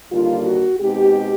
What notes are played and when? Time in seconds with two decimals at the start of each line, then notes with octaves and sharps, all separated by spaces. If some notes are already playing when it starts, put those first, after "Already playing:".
0.11 D#2 D3 G3 A#3 F4
0.46 F#4
0.80 B2 G#3 C4 D#4 G4